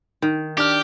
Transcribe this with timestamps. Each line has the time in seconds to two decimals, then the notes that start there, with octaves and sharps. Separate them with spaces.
0.22 D#3
0.58 D4 G4 F6